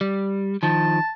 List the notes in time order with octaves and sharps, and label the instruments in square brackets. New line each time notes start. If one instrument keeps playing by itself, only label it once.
[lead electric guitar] G3
[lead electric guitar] D#3 F3 [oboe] A5